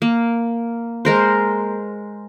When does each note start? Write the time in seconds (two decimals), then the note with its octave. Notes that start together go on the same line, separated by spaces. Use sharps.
0.02 A#3
1.05 G#3 A#4 C5